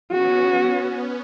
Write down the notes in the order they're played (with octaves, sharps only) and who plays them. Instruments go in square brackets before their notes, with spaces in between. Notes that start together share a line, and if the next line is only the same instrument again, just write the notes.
[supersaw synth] B3 C#4 [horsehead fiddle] F#4